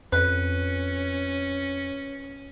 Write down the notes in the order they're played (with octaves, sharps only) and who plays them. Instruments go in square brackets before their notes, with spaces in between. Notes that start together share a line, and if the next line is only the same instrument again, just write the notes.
[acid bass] F2 [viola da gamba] C#4 [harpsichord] B4